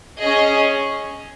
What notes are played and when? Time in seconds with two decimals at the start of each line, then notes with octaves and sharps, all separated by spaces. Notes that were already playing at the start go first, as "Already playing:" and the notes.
0.20 C#4 G#4 D#5